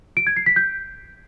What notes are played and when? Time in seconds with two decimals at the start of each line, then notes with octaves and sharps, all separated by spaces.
0.17 D7
0.27 G#6
0.36 C7
0.46 B6
0.56 G6